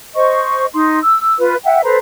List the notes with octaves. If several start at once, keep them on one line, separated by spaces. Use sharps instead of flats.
C5 D#5 C#6
D#4 C6
E6
F4 B4
E5 F#5 G5
A4 B4 C5 A#5